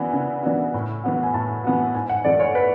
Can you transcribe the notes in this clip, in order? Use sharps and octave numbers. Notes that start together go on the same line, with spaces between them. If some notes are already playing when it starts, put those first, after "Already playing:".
Already playing: C#3 E3 B3 D4 F#4 G#5
C#3
E3 B3 D4 F#4
A2
E3 B3 F#4
G#5
A2 A5
E3 B3 F#4
G#2 G#5
F#5
E3 A3 D5
C#5
B4